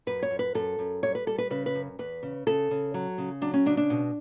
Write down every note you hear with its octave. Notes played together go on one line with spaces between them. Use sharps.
F#2 B4
C#5
F#2
B4
F#2 A4
F#2
G3 C#5
B4
G3 A4
B4
C#3 B4
B4
F#2
E2 B4
C#3
C#3 A4
C#3
F#3
C#3
F#3 D4
C#4
C#3 D4
D4
B2